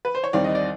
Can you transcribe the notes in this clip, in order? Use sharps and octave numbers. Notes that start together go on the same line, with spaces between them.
B4
C5
C#5
D#2 D#3 G3 C4 D5
D#5
D5